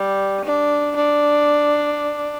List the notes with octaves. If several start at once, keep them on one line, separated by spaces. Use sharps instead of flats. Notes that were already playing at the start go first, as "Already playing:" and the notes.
Already playing: G3
D4
D4